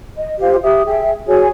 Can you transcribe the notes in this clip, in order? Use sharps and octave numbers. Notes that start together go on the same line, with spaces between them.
D#5
F4 G4 C5 F5
G4 E5 D#6
G#4 E5 G5
F#4 G#4 C#5 G#5